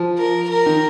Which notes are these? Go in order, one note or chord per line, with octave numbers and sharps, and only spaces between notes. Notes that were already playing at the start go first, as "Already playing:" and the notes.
Already playing: F3
A#4
A#4
D#3